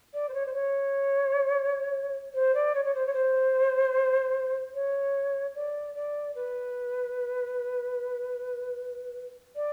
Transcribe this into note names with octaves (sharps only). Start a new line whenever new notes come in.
D5
C5
C#5
C5
C#5
C5
D5
C#5
C#5
C5
C#5
C5
C#5
D5
D5
B4
D5